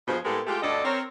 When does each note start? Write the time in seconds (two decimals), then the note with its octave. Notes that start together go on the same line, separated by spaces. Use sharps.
0.08 G2 B2 F3 F4 G#4 C5
0.25 A2 G#3 A#3 B3 G4 A4
0.47 G#3 A3 F4 G4
0.63 D2 G2 D3 A4 D5 D#5
0.85 C4 A#4 C#5